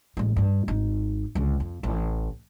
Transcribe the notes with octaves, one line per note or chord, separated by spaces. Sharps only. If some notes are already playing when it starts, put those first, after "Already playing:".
A1 G#3
G2 G3
G#1 D#4
C#2 D3
F2
A1